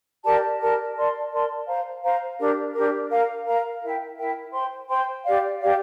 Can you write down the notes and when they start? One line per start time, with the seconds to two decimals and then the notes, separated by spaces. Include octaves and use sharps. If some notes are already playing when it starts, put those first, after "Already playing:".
0.24 G4 A#4 D5 A5
0.60 G4 A#4 D5 A5
0.96 A#4 D5 A5 C6
1.31 A#4 D5 A5 C6
1.67 C5 F5 A#5
2.03 C5 F5 A#5
2.38 D4 G4 A#4
2.74 D4 G4 A#4
3.10 A#4 F5 A#5
3.45 A#4 F5 A#5
3.81 E4 A#4 E5 G5
4.17 E4 A#4 E5 G5
4.52 C5 G5 C6
4.88 C5 G5 C6
5.24 G4 D5 F5
5.60 G4 D5 F5